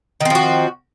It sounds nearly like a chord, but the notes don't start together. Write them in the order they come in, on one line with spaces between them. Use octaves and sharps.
D#3 C4 F3 F#4